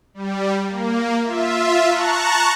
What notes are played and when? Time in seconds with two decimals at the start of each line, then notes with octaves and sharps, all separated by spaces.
0.14 G3
0.66 A#3
1.22 F4 E5
1.88 A5 A#5 C#6 F#6